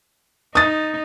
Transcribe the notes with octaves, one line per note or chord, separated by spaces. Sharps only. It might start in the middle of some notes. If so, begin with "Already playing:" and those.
D#4 D#6 A6